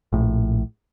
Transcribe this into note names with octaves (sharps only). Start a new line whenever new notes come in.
A#1 A2